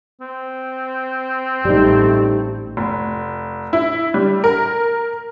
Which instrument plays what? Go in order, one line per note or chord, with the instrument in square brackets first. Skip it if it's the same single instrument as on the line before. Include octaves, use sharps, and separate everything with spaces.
[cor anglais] C4
[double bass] A1 A3 [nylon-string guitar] G3 D#4
[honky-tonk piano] F1
E4
G3
A#4